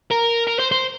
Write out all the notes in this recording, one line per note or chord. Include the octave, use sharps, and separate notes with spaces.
A#4
A#4
C5
C5